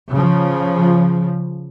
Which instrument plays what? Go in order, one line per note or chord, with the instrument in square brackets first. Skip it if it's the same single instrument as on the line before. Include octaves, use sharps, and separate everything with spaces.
[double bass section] C#3 F3